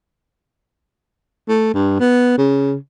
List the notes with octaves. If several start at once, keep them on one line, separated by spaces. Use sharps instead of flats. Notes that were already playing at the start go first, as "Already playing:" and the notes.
A3
G2
B3
C#3